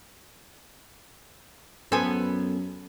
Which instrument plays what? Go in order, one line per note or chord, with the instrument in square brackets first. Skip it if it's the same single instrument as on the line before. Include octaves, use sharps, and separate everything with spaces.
[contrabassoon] F#2 [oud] B3 A4 [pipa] C5 G#5